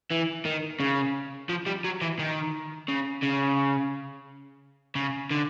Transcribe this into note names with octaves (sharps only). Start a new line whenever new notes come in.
E3
D#3
C#3
F3
G3
F#3
E3
D#3
C#3
C#3
C#3
D3